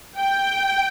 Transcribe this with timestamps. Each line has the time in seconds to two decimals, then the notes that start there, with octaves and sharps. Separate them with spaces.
0.18 G5